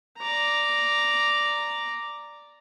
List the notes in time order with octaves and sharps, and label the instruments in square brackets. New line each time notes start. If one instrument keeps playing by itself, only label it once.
[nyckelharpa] D5 A#5